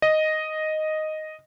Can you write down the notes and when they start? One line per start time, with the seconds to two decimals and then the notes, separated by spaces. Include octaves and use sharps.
0.02 D#5